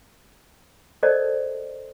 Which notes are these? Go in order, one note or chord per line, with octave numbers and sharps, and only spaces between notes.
A4 A#4 C5 D5 D#5 A5